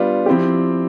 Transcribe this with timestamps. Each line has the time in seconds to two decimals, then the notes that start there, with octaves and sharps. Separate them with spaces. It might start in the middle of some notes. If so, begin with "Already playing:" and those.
Already playing: G3 B3 D4 F4
0.26 F3 C4 E4 G4